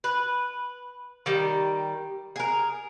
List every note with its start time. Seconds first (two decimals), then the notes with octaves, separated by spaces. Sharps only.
0.04 B4
1.26 D#3 G3
2.36 G#4 A#4